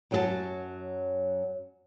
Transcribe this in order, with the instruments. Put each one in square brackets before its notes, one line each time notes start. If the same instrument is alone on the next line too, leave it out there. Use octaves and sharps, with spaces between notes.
[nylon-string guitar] F#2 F#3 F4 G#4 F#5 A5